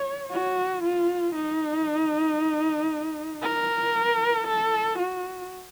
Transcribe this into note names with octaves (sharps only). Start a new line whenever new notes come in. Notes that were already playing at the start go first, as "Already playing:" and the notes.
Already playing: C#5
F#4
F4
D#4
A#4
A4
F#4